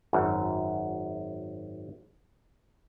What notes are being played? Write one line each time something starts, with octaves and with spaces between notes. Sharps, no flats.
G#1 F#2